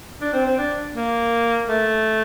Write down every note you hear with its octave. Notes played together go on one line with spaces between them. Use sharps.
D4
C4
C4
D4
A#3
A3